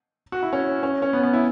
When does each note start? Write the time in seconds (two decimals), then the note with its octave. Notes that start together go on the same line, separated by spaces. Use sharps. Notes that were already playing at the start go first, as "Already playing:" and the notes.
0.32 F#4
0.43 E4
0.53 C#4
0.83 C#4
1.02 C#4
1.13 B3
1.23 B3
1.33 E4